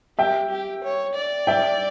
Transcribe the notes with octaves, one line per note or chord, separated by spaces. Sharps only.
G4 E5 G5
G4
C#5
D5
E5 G5